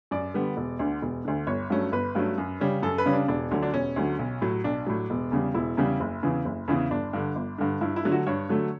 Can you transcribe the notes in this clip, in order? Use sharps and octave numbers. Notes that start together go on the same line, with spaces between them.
F#2 D5
D3 G3 B3
E1
D2 D3
E1
D2 D3
G1 C#5
G2 F#3 A3 C#4
G1 B4
G2 F#3 A3 C#4
F#2
C#3 G3 C#4
F#2 A4
B4
C#3 G3 C#4
D4
E1 D4
D2 D3 F#3
D4
E1 C#4
D2 D3 F#3
B1
A2 F#3
B1 D4
A2 F#3
E1
E2 C#3 G3
E1 E4
E2 C#3 G3
F#1
E2 C#3 E3
F#1
E2 C#3 E3
G1 D4
G2 D3
G1
G2 D3
G2 E4
E4
D3 F#3 A3
F#4
G2 C#5
D3 F#3 A3